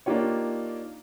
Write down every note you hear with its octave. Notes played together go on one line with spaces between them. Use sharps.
A#3 D4 D#4 F4 G4 C#5